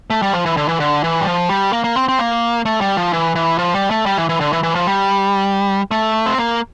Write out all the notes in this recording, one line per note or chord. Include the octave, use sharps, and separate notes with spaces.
A3
G3
F3
E3
D3
E3
D3
E3
G3
F3
G3
A#3
A#3
C4
C4
A#3
A3
G3
F3
E3
E3
F3
G3
A3
G3
E3
E3
D3
E3
E3
F3
G3
A3
C4
A#3